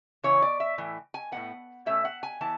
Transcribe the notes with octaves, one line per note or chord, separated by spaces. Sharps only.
C#3 E3 B3 C#5
D5
E5
A2 E3
G#5
A2 G#3 B3 F#5
B2 A3 C#4 E5
F#5
G#5
E3 B3 A5